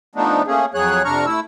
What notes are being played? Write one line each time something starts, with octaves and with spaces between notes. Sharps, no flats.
F3 A3 B3 D4 D#4
A3 A#3 C#4 G#4
F2 F#3 G#4 C#5 F#6
F2 C3 D4 A#5 C#6 F6
A3 E4 E6